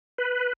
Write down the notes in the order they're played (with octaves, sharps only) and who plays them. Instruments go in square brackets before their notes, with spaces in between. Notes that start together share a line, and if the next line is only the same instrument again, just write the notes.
[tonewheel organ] B4